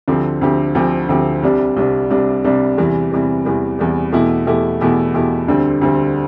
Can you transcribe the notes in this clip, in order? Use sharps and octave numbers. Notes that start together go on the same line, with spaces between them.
D2 D3 F3 C4 G4
D2 D3 F3 C4 G4
D2 D3 F3 C4 G4
D2 D3 F3 C4 G4
C2 C3 G3 D4
C2 C3 G3 D4
C2 C3 G3 D4
C2 C3 G3 D4
E2 C3 E3 G3
E2 C3 E3 G3
E2 C3 E3 G3
E2 C3 E3 G3
E2 B2 A3 E4 G4
E2 B2 A3 E4 G4
E2 B2 A3 E4 G4
E2 B2 A3 E4 G4
D2 D3 G3 C4
D2 D3 G3 C4